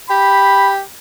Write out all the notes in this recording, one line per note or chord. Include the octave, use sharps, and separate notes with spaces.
G4 B5